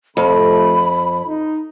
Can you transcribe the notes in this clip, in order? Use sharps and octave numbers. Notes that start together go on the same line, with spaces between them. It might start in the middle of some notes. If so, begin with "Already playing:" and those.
F2 C3 F3 A3 B5
D#4